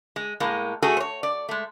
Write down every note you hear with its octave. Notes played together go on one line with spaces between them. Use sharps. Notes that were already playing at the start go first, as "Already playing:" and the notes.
G#3
A2 G#3 A#3
A3 F#4 G#4 A4
C5 C#5
D5
G#3 A3